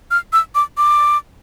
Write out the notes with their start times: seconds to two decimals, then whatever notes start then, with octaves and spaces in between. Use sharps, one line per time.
0.11 F6
0.33 E6
0.55 D6
0.77 D6